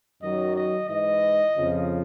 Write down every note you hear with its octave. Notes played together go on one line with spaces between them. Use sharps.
F#2 D#3 F#3 D#5
D#5
G#2 E3 D#5
F2 C#3 F3